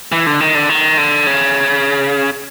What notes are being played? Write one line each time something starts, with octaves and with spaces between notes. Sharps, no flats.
E3
D3
D#3
D3
D#3
D3
C#3